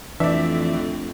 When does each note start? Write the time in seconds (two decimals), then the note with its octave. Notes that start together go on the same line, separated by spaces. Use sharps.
0.20 F2 E3 A3 C4 D4 D5 E5